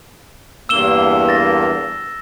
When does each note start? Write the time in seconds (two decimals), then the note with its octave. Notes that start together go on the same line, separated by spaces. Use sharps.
0.69 E2 G2 A#3 E6 E7 G7
1.29 A6 A#6